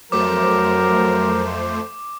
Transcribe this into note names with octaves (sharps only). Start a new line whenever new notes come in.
F2 F#3 A3 A#4 C5 D6